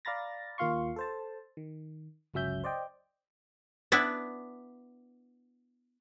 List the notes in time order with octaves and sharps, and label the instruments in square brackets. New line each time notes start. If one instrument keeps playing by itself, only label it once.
[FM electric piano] D5 F5 A#5 B5 A6 A#6
D#2 A#3 F4 F5 C6 C#6
A4 C5 A5
D#3
G1 C#2 F#3 C#4 E5 G6
C5 D5 D#5 G5
[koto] B3 D4 E4